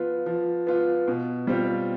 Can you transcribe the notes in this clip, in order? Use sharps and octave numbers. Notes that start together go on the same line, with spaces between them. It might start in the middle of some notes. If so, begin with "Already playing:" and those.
Already playing: F3 B3 F4
F3
B3 F4
B2
G3 C4 F4